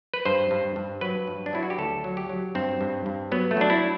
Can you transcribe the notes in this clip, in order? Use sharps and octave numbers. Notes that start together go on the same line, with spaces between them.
B4
G2 C5
G2
G2
F#3 B4
G2
D4
F#3 E4
F#4
G4
D2 A4
F#3
G4
F#3
G2 C4
G2
G2
F#3 B3
A3
F#3 D4
E4